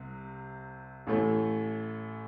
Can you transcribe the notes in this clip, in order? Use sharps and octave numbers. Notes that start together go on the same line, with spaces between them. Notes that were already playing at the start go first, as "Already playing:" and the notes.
Already playing: C2 C3 C4
A1 A2 A3